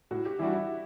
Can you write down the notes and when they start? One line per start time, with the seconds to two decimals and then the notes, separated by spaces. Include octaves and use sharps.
0.11 A2 F#4
0.25 G4
0.39 E3 G3 D4 E4 F#4
0.53 E4